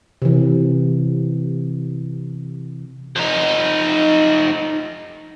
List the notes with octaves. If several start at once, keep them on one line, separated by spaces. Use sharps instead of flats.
C3 E3
F2 D#4